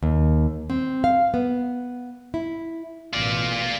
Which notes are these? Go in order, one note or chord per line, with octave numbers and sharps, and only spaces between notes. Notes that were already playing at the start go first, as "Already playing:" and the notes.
D#2
C4
F5
B3
E4
A1 B2 F4 D5